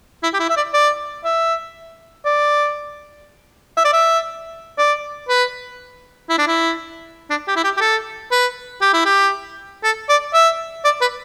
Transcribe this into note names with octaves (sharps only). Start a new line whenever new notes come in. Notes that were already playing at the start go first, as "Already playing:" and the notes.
E4
G4
E4
E5
D5
D5
E5
D5
E5
D5
E5
D5
B4
E4
D4
E4
D4
G4
E4
G4
G4
A4
B4
G4
E4
G4
A4
D5
E5
D5
B4